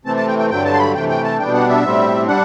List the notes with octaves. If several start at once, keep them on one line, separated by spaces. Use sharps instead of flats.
C3 E3 A3 C4 A5
A5
G5
G5
G2 D3 F#3 G5
A5
C6
B5
C3 E3 A3 G5
G5
A5
B2 G3 B3 D4 G5
F#5
E5
A2 G3 C4
G3 D4 F#5